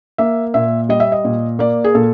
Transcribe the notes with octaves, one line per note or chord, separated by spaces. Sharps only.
A#3 E5
A#2 E5
G3 D#5
E5
D#5
A#2
A#3 D5
G#4
A#2 A4